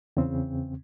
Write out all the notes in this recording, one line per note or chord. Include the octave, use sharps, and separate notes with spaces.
E2 C#3 C4